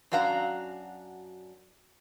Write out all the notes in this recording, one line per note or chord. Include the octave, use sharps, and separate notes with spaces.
F#2 D4 F#4 F5 A#5